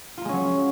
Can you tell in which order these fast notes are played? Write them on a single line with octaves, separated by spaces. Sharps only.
F4 A#3 G#3 C#4 F#3